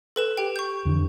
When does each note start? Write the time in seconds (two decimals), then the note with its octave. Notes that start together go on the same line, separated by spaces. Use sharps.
0.16 A4 B4 E7
0.37 G4 G5
0.56 C#6 G6
0.85 F2 D3 E3